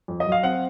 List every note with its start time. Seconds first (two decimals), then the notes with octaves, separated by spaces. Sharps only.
0.08 F2
0.20 D#5
0.26 F#3
0.32 F5
0.43 C4 F#5